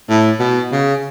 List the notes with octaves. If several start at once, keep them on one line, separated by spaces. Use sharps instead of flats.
A2
B2
C#3